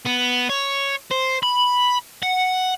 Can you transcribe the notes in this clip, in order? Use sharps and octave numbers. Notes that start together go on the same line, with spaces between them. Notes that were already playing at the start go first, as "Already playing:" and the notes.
B3
C#5
C5
B5
F#5